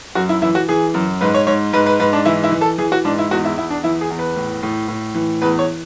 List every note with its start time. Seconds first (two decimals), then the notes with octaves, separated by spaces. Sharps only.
0.15 F#2 F#4
0.29 E4
0.42 E3 E4
0.55 F#4
0.69 E3 G#4
0.94 F#2
1.21 G#2 B4
1.34 C#5
1.47 G#2 C#5
1.73 G#2 B4
1.86 B4
2.00 G#2 B4
2.13 D4
2.25 E3 E4
2.44 E4
2.52 E3
2.61 A4
2.78 E3 G#4
2.92 F#4
3.05 G#2 D4
3.19 E4
3.31 E2 F#4
3.45 E4
3.58 E2 E4
3.70 D4
3.84 E3 E4
4.01 G#4
4.10 E2
4.19 B4
4.36 A2
4.63 A2
4.88 A2
5.14 E3
5.42 E2 B4
5.59 C#5